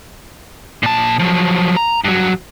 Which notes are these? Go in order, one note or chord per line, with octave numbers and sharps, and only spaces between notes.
A#2 A5
F3 F#3
A#5
G2 F#3